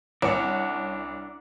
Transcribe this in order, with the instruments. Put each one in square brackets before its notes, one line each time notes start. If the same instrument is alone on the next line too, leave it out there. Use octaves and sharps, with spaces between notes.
[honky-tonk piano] C2 C#4 [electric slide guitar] D4 F#5